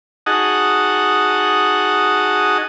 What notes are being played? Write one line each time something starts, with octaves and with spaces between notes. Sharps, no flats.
D#4 F#4 G#4 D#5 F#5 A5